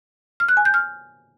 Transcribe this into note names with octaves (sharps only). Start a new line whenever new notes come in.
F6
F#6
G#5
G6
F6